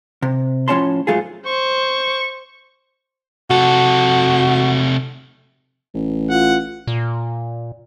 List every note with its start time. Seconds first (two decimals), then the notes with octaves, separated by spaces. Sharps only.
0.22 C3
0.68 A2 F3 C#4 C#5 A5 C6
1.07 G#2 F#3 A3 F4 G#4
1.46 C5 C#6
3.50 C3 F#4 A4
5.94 A1
6.30 F4 F#5
6.87 A#2